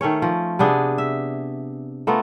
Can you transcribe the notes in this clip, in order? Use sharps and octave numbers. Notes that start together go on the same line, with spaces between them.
D#3 A3 C#4 C#5
F3
C3 B3 D4 G#4
E5
A3 B3 F4 A#4